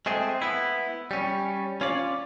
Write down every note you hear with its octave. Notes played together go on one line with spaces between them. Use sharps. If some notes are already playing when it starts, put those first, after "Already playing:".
G#3 A3 C4 G#4
B3 E4
G3 C#4
C#4 F4 C#5 D5